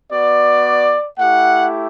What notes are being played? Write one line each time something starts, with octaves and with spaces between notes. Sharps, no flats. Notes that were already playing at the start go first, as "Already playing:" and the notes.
B3 F#4 D5
A3 E4 G4 F#5